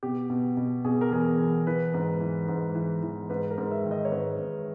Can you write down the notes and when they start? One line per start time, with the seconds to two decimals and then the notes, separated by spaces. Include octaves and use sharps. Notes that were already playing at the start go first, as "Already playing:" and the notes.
0.03 B2 G4
0.30 B2
0.57 B2
0.85 B2 G#4
1.01 A#4
1.12 E2 G#4
1.39 E2
1.66 E3 B4
1.94 G#2
2.20 E3
2.48 G#2
2.75 E3
3.03 E3
3.30 G#2 B4
3.51 A#4
3.58 G#2
3.71 E5
3.84 D#3
3.91 D#5
4.05 C#5
4.11 G#2 B4
4.39 G#2